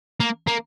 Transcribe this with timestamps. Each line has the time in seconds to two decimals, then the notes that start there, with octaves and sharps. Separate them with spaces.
0.20 A#3
0.47 A#3